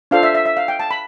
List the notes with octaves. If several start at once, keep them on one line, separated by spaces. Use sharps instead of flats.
D4 F4 A4 C5 F5
E5
E5
E5
F5
G5
A5
B5